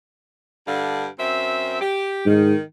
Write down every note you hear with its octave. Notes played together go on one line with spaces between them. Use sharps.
G2 D3 F5
F#2 C4 E5
G4
G#2 D#3